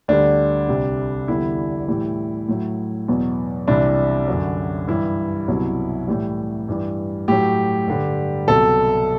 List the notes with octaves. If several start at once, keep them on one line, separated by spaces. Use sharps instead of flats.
D2 D3 G3 D4
C2 C3 G3
E2 D3 G3 E4
A2 E3 G3
A2 F#3
E2 B2 F#3
C2 C3 E3 G3 D4
F#2 D3 F#3
G2 E3 G3 E4
C2 B2 F#3
A2 E3 G3
G2 E3 G3
A2 F#3 G4
G2 D3 G3
C2 B2 F#3 A4